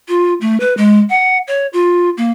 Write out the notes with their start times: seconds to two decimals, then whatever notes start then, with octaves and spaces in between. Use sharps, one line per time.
0.08 F4
0.41 A3
0.60 B4
0.77 G#3
1.10 F#5
1.47 C#5
1.73 F4
2.17 A#3